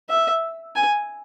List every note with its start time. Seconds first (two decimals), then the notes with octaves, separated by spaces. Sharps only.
0.09 E5
0.76 G#5